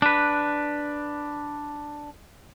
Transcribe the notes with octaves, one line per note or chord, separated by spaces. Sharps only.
D4 B4